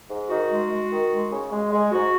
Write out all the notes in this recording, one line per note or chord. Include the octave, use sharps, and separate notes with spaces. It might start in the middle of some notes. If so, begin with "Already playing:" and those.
G#2
D#3 F#4
G#3
G#3
D#3
G#3
C#3
G#3
G#3
G#2 F#4